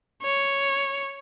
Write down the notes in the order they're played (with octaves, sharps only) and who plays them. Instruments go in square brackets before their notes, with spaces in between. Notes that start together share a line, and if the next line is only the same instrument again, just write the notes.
[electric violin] C#5